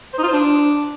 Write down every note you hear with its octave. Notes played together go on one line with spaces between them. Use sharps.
C5
D#4
F4
C5
D4